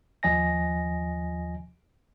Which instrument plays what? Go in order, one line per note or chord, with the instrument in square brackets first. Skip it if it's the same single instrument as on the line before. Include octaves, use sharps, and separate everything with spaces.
[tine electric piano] D#2 F3 D#5 G#5 A#6